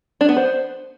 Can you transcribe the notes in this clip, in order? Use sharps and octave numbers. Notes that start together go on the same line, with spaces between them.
D4
B3
C5